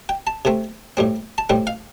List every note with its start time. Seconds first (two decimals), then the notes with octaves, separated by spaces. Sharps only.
0.09 G5
0.27 A5
0.45 C3 A3 C4
0.97 A2 G3 C4
1.38 A5
1.50 A2 G3 C4 G5
1.67 F5